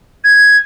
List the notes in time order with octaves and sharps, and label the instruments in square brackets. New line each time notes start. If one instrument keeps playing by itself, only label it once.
[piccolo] G#6